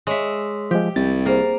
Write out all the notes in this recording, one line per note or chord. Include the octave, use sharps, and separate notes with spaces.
G#3 C#5 E5 C#6
F3 G#3 G4 G6
C2 A6
A#3 G#4 C5